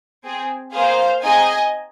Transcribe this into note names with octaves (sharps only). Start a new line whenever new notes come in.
C4 G#4
A#3 G#4 C5 F5
C4 D#4 G#4 D#5 G#5